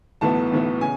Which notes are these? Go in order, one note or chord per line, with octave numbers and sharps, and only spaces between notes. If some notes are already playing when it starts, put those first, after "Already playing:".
B1 A2 E3 B3 A5
B1 A2 E3 B3
C#3 G#5